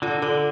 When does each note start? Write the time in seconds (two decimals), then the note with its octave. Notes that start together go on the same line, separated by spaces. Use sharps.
0.02 D3 F4
0.22 D3 A4